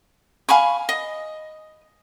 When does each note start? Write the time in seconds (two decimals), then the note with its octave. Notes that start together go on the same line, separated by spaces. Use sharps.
0.49 F5 G#5 B5 C#6
0.89 D#5